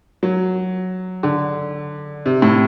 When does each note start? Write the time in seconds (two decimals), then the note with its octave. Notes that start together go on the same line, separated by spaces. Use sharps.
0.23 F#3
1.23 D3
2.26 C3
2.42 A2